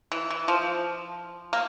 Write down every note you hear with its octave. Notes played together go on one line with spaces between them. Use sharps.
E3
E3
F3
A#3